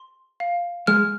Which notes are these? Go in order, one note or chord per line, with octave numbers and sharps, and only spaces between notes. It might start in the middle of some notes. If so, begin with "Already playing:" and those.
Already playing: C6
F5
G#3 F6